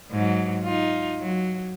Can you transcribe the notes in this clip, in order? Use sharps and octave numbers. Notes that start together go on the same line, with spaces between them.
G#2 F#3
D#4 F4
F#3